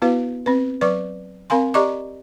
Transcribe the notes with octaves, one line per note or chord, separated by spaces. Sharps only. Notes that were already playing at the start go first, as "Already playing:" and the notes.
B3 E4 F#4 B4 F5
C4 B4
F#3 B4 D5 C#6 D6
C4 A#4 F5 G#5 C6
G4 D5 D#5 A#5 C#6 D6